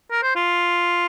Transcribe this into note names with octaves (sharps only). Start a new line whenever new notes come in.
A#4
C5
F4